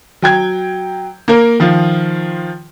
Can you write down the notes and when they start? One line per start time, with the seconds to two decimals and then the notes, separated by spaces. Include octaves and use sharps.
0.22 F#3 G5 G#6
1.28 A#3 A#4
1.60 D#3 F3 F4